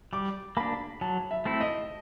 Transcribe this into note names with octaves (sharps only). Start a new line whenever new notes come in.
G3 D6
A#3 D4 B5
F#3 A5
E5
A3 C4 E4
D#5